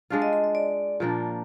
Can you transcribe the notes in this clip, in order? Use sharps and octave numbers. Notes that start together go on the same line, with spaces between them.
G#3 D4 F4 F5
D#5
D#5
D#5
D5
A#2 F3 A#3 D4